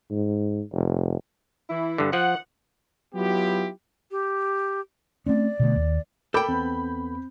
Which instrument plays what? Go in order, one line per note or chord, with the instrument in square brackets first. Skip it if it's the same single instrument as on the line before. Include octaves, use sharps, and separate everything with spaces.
[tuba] G#2
F1
[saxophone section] E3 E4
[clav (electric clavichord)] G2 D3
[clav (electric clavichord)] F3 [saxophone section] F#5
[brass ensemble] F#3 B3 E4 F4 G4
[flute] G4
[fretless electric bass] A3 C4 C#4 [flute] D5
[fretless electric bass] B2 D3 A3
D#2
[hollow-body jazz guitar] A4 G5 [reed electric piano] A#4 D6 [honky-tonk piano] B5 G6
[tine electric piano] E2 B3 [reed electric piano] C4